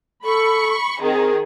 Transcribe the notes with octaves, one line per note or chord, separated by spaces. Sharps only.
A4 B5 C#6
D#3 C4 G#4